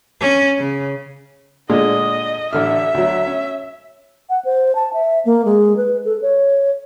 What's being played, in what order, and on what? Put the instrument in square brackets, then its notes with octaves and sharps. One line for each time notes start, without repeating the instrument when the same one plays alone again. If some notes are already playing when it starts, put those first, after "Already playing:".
[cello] C#4
C#3
[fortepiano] A#2 D3 G#3 [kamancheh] D#5
[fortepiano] A1 D3 F6 [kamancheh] E5
[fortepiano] D2 F#3
C#4
[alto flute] F#5
C5
A5
E5
A#3
G#3
B4
A4
C#5